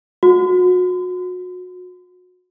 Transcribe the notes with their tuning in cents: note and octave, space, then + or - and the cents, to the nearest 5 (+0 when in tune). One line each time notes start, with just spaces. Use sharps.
F#4 -30